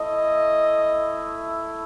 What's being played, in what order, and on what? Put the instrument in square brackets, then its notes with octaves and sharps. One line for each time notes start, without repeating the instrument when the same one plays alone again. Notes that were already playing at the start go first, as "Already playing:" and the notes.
Already playing: [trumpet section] A3 E4 D#5